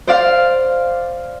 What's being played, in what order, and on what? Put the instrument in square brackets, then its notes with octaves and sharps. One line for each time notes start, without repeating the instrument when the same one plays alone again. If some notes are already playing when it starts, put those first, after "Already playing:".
[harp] C5 D5 F5